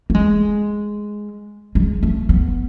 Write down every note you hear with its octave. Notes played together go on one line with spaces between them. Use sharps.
A3
G#3
G#3
A3
B3